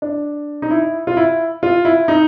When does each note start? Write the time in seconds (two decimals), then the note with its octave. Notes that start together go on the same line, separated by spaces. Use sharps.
0.02 D4
0.62 D#4
0.71 E4
1.07 F4
1.17 E4
1.63 F4
1.85 E4
2.08 D#4